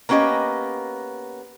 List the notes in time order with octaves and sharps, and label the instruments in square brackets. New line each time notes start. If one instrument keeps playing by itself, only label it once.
[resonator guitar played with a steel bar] A#3 B3 C#4 G4 D#5